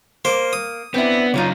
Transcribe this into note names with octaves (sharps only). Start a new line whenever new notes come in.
A#3 C5
D#6
B3 C4 D4 E4
C#3 F#3 D#4 F4 C#5